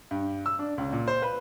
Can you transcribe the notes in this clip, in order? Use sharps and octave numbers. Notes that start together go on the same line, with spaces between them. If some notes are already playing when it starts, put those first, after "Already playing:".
G2
E6
D4
C#2
A#2
C5
B4